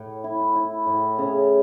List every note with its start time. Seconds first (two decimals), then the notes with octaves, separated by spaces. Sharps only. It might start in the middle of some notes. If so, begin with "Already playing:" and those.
Already playing: A2
0.24 E4
0.56 E4
0.87 A2
1.18 C#3